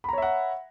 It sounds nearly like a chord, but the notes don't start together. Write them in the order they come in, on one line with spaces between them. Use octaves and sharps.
B5 A#5 C#5 E5 F#5